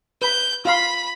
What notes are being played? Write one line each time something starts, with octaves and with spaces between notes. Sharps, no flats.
B4 B5 G6
F4 F5 B5 C6